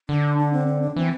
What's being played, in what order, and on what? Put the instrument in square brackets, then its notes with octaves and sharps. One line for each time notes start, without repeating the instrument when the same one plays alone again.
[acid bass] D3 [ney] D4
[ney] D4
C4
C4
D4
[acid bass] E3 [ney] C4